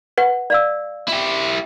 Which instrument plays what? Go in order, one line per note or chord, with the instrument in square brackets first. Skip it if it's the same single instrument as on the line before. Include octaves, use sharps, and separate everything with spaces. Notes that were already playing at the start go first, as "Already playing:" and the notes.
[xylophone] B4 F#5
[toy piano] D5 F5 E6
[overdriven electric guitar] E4 G4